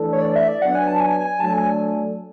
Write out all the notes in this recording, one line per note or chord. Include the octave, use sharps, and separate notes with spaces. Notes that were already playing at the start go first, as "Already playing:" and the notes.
Already playing: E3 A3 D4 A4
C#5
D5
E5
D5
F#3 B3 D4 F#5
G#5
A5
G#5
G#5
F#3 A3 D4 A4 A5
G#5